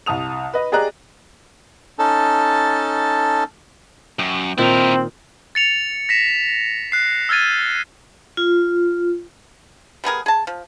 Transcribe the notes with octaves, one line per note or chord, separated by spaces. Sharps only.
C2 A5 D#6 F7
B4 D#5
G4 G#4 D5 D#5 A#5 F#6
C#4 D#4 A4 A5
F#2 G5
A#2 D#3 C4 E4 A#4
A6 C#7 F7
A#6 B6 E7
F#6 C7
E6 F6 G#6 A6 D#7
F4
G3 B3 G#4 A#4
G#4 A5
F3